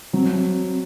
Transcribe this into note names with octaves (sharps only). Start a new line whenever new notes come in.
F#3 C4